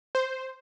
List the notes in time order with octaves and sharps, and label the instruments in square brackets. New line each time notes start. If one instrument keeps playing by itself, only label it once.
[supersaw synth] C5